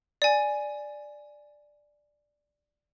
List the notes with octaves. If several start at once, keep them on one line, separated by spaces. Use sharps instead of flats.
D5 G#5